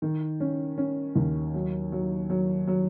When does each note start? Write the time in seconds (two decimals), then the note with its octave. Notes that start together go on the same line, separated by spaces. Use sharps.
0.02 D#3
0.40 C#4
0.78 C#4
1.16 D#2
1.54 F#3
1.92 F#3
2.30 F#3
2.68 F#3